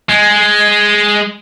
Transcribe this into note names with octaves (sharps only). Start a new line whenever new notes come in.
G#3